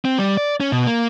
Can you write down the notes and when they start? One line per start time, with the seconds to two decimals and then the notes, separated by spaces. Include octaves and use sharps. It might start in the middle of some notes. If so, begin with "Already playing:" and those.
0.05 C4
0.18 G3
0.37 D5
0.60 C#4
0.72 B2
0.86 A#3